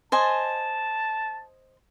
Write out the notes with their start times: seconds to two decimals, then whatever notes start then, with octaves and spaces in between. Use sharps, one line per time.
0.12 C5 D#5 G#5 A5